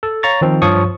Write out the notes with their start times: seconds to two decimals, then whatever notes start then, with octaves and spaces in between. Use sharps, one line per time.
0.03 A4
0.23 C#5 F5 A#5 C#6 A6
0.41 D#3 F3 C4 D#4
0.62 G2 F3 C#5 C#6 D#6